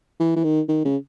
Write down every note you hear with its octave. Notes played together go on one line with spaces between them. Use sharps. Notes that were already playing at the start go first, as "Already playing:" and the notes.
E3
E3
D#3
D#3
C#3